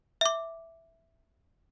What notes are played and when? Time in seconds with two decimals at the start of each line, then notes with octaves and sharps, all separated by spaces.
0.21 E5 D6